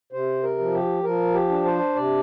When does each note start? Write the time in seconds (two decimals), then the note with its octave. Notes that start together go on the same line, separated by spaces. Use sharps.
0.13 C3 C5
0.43 A#4
0.59 F3
0.73 G4
1.04 F3 A#4
1.34 G4
1.49 D4
1.65 C5
1.96 C3 D5